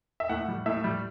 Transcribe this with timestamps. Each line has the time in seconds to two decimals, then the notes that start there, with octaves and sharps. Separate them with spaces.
0.20 E5
0.29 A2 F#5
0.48 G3
0.66 A2 E5
0.84 G3